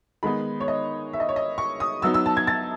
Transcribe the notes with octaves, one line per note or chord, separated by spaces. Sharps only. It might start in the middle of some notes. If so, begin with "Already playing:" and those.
D#3 G#3 B3 D#4 B5
C#5
D#5
E5
D#5
C#5
D#5
C#6
D#6
F#3 B3 D#4 E6
E6
A5
G#6
A6